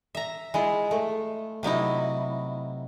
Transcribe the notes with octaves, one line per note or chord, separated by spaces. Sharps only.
E5 A#5
G#3 E4 F4
A3
C3 F#3 D#4 E4